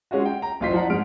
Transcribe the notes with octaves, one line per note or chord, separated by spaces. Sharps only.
G#3 C#4 F4 F#4
G5
A#5
A1 F#2 F4 C5 B6
F3 D5 F#5 A#5
G#2 G#3 F6 D7